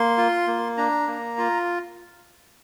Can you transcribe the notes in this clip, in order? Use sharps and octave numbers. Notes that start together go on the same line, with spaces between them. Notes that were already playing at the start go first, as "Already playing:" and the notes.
Already playing: A#3 C6
F4
A#3
D4 A#5
A#3
F4